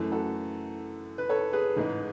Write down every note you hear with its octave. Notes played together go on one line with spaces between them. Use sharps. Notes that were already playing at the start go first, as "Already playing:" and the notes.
Already playing: F#2 E3 A3
F#4 A4
B4
A4 C#5
G#4 B4
A1 G#2 G#3